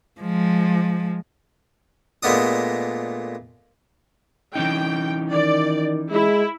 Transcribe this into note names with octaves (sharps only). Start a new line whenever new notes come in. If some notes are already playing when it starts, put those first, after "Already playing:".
F3 G#3
A#2 G#3 A3 B3 D4 D#6
E3 C#4 D#4 G5
D#3 D5
G#3 E4